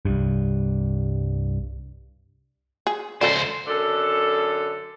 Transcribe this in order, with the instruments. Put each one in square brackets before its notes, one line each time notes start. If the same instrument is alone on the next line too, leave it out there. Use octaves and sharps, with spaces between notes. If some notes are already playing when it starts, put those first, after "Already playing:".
[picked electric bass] C2 G2
[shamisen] G#4
[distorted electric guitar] C#2 C5 [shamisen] C#3 A4 D5
[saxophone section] F#2 D3 A4